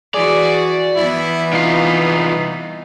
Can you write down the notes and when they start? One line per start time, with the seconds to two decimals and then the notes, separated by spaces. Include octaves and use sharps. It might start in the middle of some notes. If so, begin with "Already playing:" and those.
0.14 E3 F#4 G#4 D5
0.96 E3 B3 E4
1.53 C2 D#4 F4